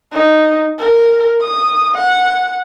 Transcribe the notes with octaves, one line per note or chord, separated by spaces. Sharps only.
D#4
A#4
D#6
F#5